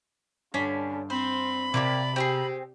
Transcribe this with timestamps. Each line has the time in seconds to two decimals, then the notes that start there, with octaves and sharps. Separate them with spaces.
0.54 G2 D3 C#4 D4 B5
1.10 C4 C5 B5
1.74 C3 A#3 F4 G4 D5
2.16 C4 E4 G4 G#4